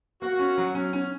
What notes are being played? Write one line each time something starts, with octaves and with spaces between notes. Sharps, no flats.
A#3 F#4
C#4
F#3
C#4
C#4